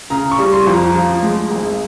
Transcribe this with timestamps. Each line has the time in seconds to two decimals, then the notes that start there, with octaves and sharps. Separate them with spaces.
0.10 C#3 A#5
0.32 C#6
0.38 G3
0.53 C6
0.67 F2
0.73 A#5
0.94 F3
1.23 G#3
1.50 G#1